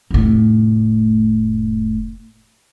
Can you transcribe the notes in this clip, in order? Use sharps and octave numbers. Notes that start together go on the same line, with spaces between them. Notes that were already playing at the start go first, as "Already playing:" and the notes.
F1 A2